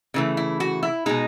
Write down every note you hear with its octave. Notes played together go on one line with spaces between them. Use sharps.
C#3 E3 A3
E4
F#4
E4
B2 G#3 D#4